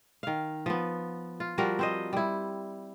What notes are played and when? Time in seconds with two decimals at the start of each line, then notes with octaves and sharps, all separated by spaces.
0.23 D#3 F5
0.66 F3 B3
1.40 F4
1.58 F3 G3 F#4 A#4
1.79 C4 C5 D#5
2.13 G3 E4